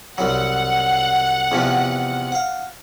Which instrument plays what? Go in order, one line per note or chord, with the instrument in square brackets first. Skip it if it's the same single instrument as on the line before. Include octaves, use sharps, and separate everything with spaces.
[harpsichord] C2 F#3 [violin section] F#5
[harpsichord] E2 C3 F3
F5 F#5